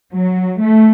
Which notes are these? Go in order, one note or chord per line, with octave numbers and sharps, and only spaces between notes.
F#3
A3